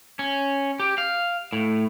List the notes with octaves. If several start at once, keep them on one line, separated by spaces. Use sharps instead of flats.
C#4
G4
F5
A2